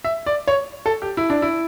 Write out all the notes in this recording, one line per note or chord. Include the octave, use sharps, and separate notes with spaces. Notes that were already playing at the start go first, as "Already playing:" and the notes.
E5
D5
C#5
A4
G4
E4
D4
E4